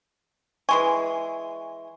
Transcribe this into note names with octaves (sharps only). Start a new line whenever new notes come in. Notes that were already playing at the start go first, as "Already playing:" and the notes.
E3 G#3 G#5 C#6